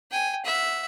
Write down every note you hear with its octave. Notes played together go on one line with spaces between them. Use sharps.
G5 G#5
E5 F#5